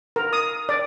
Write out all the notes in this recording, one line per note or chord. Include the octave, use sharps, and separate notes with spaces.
A#4
D#6
D5